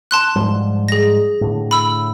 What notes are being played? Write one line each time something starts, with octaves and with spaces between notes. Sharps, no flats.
A5 C6 F#6
G#2 F3 G3
G#4 A#6
A2 D3
B5 E6